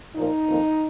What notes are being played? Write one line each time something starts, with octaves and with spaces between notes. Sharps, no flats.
A#2 F3 A#3 D#4
F2 D#3 A#3